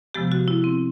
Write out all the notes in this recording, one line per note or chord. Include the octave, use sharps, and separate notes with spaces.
C3 F3 G#3 B3 G4
F#4
E4
C4